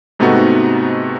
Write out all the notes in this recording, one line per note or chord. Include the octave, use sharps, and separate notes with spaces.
G#2 C3 A3 B3 D#4 F#4